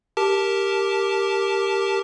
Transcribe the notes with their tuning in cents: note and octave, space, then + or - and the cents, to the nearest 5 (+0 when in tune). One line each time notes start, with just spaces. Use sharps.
G4 +0 A#4 -5 A5 -5